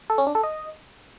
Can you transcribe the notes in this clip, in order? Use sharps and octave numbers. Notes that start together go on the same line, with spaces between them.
A4
C#4
D4
A4
D#5